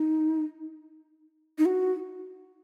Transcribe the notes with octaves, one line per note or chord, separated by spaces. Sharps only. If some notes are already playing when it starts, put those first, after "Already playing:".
Already playing: D#4
D#4
F#4